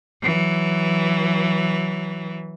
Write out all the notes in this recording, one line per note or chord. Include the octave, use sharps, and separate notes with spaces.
E3 F#3